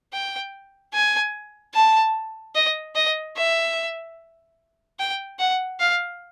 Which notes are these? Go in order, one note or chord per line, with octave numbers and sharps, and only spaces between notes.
G5
G#5
A5
D#5
D#5
E5
G5
F#5
F5